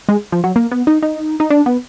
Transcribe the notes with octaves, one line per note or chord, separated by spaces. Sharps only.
G#3
F3
F#3
A#3
B3
D#4
D#4
D#4
D4
B3